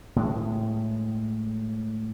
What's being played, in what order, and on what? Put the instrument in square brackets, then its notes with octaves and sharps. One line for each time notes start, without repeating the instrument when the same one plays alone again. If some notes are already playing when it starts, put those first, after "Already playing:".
[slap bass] A2 G#3